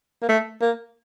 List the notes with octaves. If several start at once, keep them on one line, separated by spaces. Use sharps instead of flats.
A#3
A3
A#3